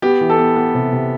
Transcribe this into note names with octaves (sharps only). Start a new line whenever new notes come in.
B3 G4
E3
A4
B3
B3
C3
C3